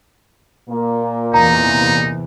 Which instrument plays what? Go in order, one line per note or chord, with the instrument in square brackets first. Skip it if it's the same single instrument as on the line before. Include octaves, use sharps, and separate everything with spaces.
[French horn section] A#2 A#3
[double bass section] E2 C3 E3 [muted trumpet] D#4 [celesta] A#5